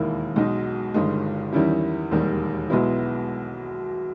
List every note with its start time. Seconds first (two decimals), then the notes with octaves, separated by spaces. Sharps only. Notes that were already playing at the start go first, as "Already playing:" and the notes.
Already playing: E1 D#2 D#3 A#3 E4
0.36 B1 B2 G#3 D#4
0.94 G1 G2 D#3 G#3
1.53 E2 D#3 G3 C#4 E4
2.11 E1 D#2 D#3 G3
2.70 B1 B2 G#3 B3 E4